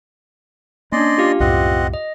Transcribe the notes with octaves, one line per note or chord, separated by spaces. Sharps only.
A#3 C#4 D4 D5 D#5 C6
F4 G4 F5
C2 F#2 A2 C4 D#5 F#5
D#5